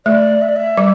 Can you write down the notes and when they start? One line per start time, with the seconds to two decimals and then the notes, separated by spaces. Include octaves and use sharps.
0.06 A3 D5
0.41 E5
0.49 D5
0.56 E5
0.78 G3